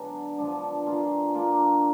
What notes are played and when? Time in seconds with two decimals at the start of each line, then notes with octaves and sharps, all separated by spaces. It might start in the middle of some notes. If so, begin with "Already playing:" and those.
Already playing: D3 F#3 B3 D4 F#4 G#4
0.38 F3 B3 D4
0.86 A#3 F4 G#4
1.34 A#3 D4 F4